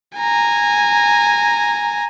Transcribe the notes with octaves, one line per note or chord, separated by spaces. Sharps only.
G#5 A#5